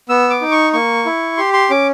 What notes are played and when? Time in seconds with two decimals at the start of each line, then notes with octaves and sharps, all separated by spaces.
0.09 B3 E6
0.30 D6
0.41 D#4
0.52 C#6
0.73 A#3 C#6
1.06 E4
1.37 G4 C6
1.53 C6
1.70 C#4 D6